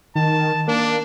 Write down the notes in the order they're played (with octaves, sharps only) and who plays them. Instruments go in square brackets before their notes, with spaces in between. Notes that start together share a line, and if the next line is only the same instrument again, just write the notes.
[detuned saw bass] D#3 [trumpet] A5
[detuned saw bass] A#3 [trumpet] D4